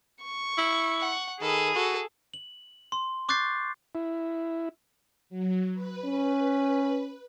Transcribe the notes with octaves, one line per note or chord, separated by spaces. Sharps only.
C#6
E4
F#5
D#3 G#4 A4 B5 D#7
F#4 A4
F#7
C6
C#6 D6 F#6 G6 A6 C7
E4
F#3
B4
C#4